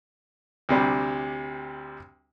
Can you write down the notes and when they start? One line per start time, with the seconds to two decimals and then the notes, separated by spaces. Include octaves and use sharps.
0.69 D2 C3 G3